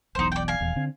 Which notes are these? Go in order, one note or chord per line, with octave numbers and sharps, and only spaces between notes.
E1 B1 E2 D#4 C5
D5 G5
F5 G#5
D#1 E2
D3 C4